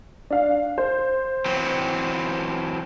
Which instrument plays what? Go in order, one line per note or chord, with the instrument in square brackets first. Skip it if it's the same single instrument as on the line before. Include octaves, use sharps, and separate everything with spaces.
[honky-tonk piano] D4 F5
C5
[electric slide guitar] E3 F#3 C4